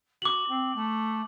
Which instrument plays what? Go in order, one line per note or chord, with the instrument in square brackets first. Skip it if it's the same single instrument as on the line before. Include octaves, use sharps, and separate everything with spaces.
[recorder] F#4 [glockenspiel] D6 F#7
[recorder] C4
A3